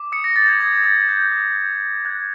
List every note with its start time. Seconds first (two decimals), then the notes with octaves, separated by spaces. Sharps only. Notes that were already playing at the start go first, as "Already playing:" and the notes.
Already playing: D6
0.12 D#6 C#7
0.24 A#6
0.36 G6 A6
0.48 G#6
0.60 D#6 G#6
0.84 D#6 A6
1.09 G6
1.32 D#6
1.57 G6
1.80 G6
2.05 F#6 G#6